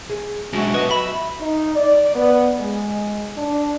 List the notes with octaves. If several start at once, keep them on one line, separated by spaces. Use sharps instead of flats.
G#4
F#3 G#3 D4 E4 F#4 G4
F#3 B3 B4 D#5
E5 B5
D#4
D5
B3
G#3
D4